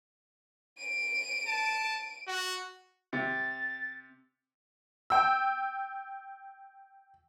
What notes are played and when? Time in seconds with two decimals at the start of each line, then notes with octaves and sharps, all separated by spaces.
0.78 D7 D#7
1.47 A5
2.28 F#4
3.13 C3 A6
5.10 G5 E6